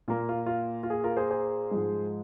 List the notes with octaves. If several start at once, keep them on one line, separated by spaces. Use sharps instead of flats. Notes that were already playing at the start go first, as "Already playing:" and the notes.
A#2 A#3 F4
F4
F4
F4
G#4
F4 A#4
G#4 C5
G#4 C5
G#2 F3 G#3